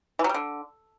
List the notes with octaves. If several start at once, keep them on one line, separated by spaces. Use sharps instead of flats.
E3
F#3
G3
D3